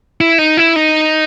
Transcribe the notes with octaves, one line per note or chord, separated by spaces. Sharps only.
E4
D#4
E4
D#4